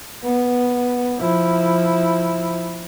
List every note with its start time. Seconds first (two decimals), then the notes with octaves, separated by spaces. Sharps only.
0.24 B3
1.19 F3 E4